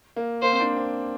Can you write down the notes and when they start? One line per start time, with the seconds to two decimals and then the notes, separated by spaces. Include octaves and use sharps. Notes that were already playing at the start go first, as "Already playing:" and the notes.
0.16 A#3
0.43 A#3 C5
0.52 C4
0.60 D4
0.76 C4